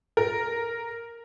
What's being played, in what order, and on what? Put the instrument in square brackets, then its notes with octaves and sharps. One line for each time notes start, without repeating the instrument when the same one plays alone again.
[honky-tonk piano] A#4